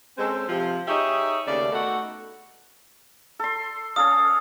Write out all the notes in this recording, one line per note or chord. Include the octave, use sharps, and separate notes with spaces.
G#3 C4 C#4 A4 C5
C3 F3 C5
D#4 G4 G#4 C#5 D#5 E5
D#2 C#3 A3 D5
A3 B3 D#4 F#4 A4
A4 C6
C#4 A4 F5 D#6